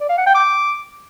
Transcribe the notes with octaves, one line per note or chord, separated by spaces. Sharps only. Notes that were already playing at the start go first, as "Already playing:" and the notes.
D5
F5
F#5
G5
D6